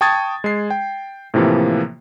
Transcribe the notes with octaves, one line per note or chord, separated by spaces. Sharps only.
G5 A5 C#6 D#6 G#6 A6
G#3 C7
G5
A2 C3 E3 F3 A#3